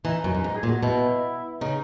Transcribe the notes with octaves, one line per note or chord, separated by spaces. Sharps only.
E3 D#4
F#2
F#2
G#2
G#4
A#2
F#4
B2 E4
C#3 D#4